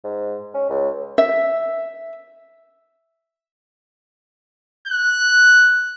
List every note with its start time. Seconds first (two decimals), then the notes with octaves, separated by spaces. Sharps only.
0.04 G#2
0.54 C#4
0.70 C#2
1.18 E5
4.88 F#6